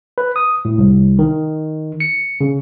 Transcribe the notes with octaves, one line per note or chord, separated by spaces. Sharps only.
B4
D#6
A2
C2
D#3
C#7
C#3